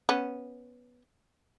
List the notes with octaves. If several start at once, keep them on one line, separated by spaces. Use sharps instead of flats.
B3 C#4